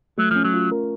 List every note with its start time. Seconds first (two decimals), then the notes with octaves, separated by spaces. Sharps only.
0.18 F#3 A3
0.31 F3 C#4
0.44 F#3
0.54 F4
0.72 A#4